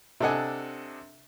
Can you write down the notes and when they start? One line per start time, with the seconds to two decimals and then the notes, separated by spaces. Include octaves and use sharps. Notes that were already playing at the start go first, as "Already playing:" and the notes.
0.21 C3 D4 A4 D#5 F#5 G#5